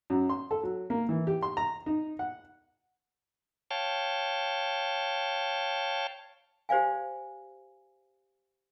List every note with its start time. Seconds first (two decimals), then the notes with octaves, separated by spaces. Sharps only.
0.10 F#2
0.29 C6
0.51 A4
0.63 F#3
0.90 A#3
1.09 E3
1.27 G4
1.43 C6
1.57 A#5
1.86 D#4
2.19 F#5
3.71 C#5 F5 G5 A5
6.69 G4 C5 D5 F5 G#5